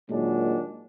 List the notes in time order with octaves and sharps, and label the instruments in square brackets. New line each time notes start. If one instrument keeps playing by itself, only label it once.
[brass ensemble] A#2 D#3 F#3 G#3 D4